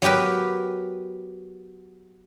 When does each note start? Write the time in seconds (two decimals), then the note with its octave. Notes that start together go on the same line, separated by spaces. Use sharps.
0.02 F#3 B3 G4 A#4 B4